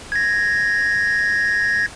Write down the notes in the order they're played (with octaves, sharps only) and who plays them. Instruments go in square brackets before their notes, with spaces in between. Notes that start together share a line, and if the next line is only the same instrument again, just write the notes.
[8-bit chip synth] G#6 A#6